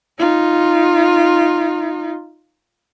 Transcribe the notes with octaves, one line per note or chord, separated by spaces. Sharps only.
D#4 F4